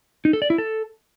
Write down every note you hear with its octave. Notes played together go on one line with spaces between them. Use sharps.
D#4
A4
D5
E4
A4